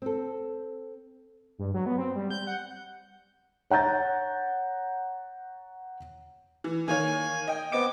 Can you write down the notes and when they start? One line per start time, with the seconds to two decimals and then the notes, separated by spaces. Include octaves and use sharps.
0.02 C4 A4
1.59 G2
1.74 F#3
1.86 B3
1.98 C4
2.16 G3
2.30 G6
2.47 F#5
3.70 C#5 F#5 A#5 G6 A6
6.64 E3
6.88 D#3 A#3 C#5 G#5
7.48 D#5 G5
7.72 B3 C4 D#5 D6 D7